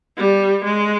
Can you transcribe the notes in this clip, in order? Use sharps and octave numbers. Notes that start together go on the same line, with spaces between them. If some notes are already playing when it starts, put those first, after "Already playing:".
G3
G#3